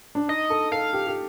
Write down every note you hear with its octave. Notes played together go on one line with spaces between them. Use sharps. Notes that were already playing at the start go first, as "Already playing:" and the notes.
D4
D#4 D#5
A4
A4 F5
G4
G4